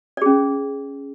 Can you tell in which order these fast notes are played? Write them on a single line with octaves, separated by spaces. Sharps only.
D5 G#4 C#4